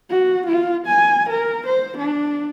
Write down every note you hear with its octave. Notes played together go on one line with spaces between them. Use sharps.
F#4
F4
G#5
A#4
C5
D4